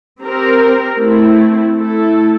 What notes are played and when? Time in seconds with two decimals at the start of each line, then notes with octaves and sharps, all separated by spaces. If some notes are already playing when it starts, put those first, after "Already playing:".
0.21 C4 G4 A#4
0.98 A3 C4 E4
1.75 A3 E4 A4